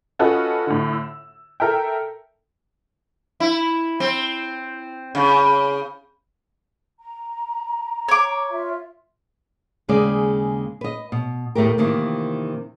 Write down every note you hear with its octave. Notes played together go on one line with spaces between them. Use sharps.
C#4 F4 F#4 A4 B4 D#5
A2 D3
E6
A4 A#4 E5 G5
E4
C4
C#3
A#5
C#5 D6
F4 E5
D#2 C#3 G#3 D5
B4 D#5
B2
D#2 A2 A3 B3 G4 A#4
F2 C3 D#3 E3 A#3